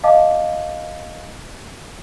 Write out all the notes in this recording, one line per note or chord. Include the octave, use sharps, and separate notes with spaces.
D#5 F5 A5 D6